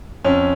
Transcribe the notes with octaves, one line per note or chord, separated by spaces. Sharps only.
F2 C#4